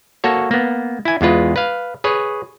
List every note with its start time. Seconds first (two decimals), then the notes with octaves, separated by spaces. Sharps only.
0.24 A#3 F#4 A4 C#5
0.51 A#3 B3
1.05 E4 G#5
1.21 E2 G#3 F4 B4
1.56 B4 F5
2.04 G#4 B4 C#5